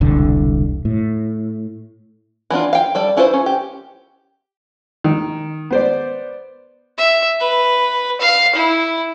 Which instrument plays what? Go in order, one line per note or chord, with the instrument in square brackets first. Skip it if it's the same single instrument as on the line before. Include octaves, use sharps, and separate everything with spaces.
[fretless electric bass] E1 C2 D3
A2
[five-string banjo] E3 B3 D4 F4
F5 G5
G3 A4 D5
C#4 E4 F4 B4 C5
C#4
G4
[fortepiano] D#3
B3 C5 D5
[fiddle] E5
B4
F5
E4